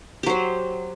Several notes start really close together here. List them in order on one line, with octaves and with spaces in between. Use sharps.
G4 F#3 C5